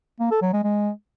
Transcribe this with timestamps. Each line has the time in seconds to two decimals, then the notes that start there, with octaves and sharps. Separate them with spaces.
0.20 A#3
0.31 A4
0.42 F#3
0.53 G#3
0.64 G#3